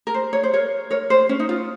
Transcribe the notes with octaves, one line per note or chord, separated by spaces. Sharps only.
A#4
C5
C#5
C5
A#4 C#5
A#4 C#5
C5
C#4
D#4
F4